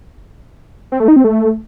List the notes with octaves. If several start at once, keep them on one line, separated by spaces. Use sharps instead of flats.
C4
A3
D#4
C4
A3